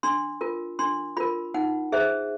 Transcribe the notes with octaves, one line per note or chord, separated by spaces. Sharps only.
D4 C6
F4 A#4
D4 C6
F4 A#4 B5
D#4 F#5
G#4 C5 E5